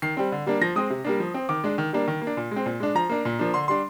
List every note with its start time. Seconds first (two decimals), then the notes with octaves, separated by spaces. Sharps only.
0.02 D#3 C7
0.17 G3 C4
0.32 D3
0.46 G3 A#3 D4
0.61 F3 A#6
0.76 G#3 C4 D#6
0.90 C3
1.04 G3 A#3 D4
1.20 F3
1.34 C4
1.49 D#3 D6
1.64 G#3 D4
1.78 D#3
1.93 G3 A#3 D4
2.08 D#3
2.22 A#3
2.27 D4
2.37 A#2
2.51 G#3 C4
2.66 A#2
2.80 G#3 D4
2.95 F3 A#5
3.09 A#3 D4
3.25 A#2
3.39 F3 A#3 D4
3.54 D3 C6
3.68 G3 D4 C6